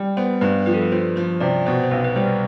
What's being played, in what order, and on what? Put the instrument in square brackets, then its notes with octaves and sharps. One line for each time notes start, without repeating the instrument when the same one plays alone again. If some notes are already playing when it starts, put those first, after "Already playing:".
Already playing: [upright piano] G3
[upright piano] B3 [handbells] C5
[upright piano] G2 [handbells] B4
[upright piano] F3 [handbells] B4
[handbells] A4
B4
[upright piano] F3 [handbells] C5
[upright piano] F3 [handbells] C5
[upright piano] C3 [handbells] D5
[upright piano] B2 [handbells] C5
[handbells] C5
[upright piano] B1 [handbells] B4
[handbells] B4
[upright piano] G3 [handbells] C5